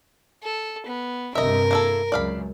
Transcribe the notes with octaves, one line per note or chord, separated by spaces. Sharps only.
A4
B3
G2 C3 A#4 D#5 E5
A#3 E4 A4
C#2 F#2 D5 F5 B5